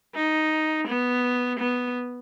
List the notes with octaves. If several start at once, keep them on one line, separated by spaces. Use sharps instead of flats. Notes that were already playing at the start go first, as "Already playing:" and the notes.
D#4
B3
B3